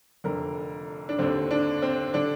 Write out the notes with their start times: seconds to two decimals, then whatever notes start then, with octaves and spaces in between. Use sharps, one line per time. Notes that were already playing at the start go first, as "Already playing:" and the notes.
0.24 F1 F2 D3 A#4
1.09 D4
1.19 D#2 D3 C4
1.51 D4
1.82 C4
2.14 D3 D4